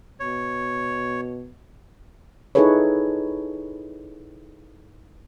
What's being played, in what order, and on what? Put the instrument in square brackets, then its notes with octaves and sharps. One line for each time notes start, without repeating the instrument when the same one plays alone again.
[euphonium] B2 [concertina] C#5
[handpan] D#4 E4 G#4 A4 B4 C#5